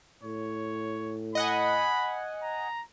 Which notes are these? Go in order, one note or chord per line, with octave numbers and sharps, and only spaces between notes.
A2 C#5
D#5 F#5 G#5 B5
A#5